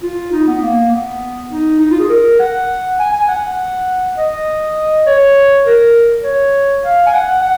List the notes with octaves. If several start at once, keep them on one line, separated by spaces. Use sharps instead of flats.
F4
D#4
B3
A#3
B3
D#4
D#4
F4
G#4
A#4
F#5
G#5
G#5
F#5
D#5
C#5
A#4
C#5
F5
G#5
F#5
F#5